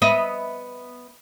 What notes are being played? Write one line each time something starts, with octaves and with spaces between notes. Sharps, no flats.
B3 D#5 E5